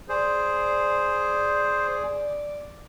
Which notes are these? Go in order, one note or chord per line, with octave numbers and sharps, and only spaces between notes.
G#4 C5 D5